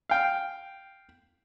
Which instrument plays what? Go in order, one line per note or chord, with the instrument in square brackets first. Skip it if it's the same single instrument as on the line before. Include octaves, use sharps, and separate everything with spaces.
[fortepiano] F5 G5